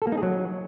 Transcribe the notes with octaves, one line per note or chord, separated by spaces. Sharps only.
A4
A#3
D#4
G#4
F#3